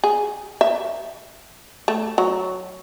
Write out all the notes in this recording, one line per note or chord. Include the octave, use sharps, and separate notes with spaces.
G#4
E5
A3
F#3